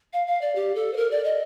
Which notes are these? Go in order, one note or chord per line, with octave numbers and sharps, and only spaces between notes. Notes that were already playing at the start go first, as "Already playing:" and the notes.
F5
F5
D5
G4
A4
C5
A#4
D5
D#5